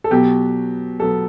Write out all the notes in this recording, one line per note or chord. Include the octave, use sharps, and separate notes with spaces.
A4
B2 F#3 B3 G4
B2 F#3 B3 A4